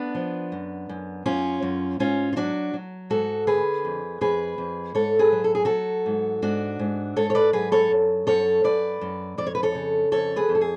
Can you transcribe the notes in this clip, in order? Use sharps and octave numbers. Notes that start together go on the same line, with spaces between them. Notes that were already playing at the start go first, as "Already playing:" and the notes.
Already playing: B3 D4
F3
F#2
F#2
F#2 C#4 F4
F#2
G#2 C#4 F4
F4
F#3 D4 F#4
F#3
G#2 F#4 A4
D3 G#4 B4
F2
F2 G#4 B4
F2
G#2 A4 C#5
G#4 B4
F#3
A4
G#4
F#3 F#4 A4
G#2
G#2 D4 F#4
G#2
G#2 A4 C#5
C#5
B4 D5
F#3 G#4 B4
A4 C#5
F#2
F#2 A4 C#5
F#2 B4 D5
F#2
F2 D5
C#5
B4
A4 C#5
C#3
F2 A4 C#5
G#4 B4
F2
A4
G#4